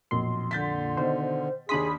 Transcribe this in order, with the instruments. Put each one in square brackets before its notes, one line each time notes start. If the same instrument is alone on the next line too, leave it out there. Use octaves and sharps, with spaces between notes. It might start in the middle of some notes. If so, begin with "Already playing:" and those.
[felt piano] B1 [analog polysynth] F2 A#2 C6
[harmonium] D3 [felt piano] G6 A6 B6
[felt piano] B2 D#3 [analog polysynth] C5
[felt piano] D#2 D4 C6 [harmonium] G#4 [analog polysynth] B5 D#6 B6